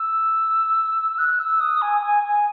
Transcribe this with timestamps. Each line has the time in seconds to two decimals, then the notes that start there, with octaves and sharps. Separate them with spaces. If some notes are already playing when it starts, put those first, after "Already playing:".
Already playing: E6
1.18 F#6
1.40 E6
1.61 D#6
1.82 G#5
2.02 G#5
2.24 G#5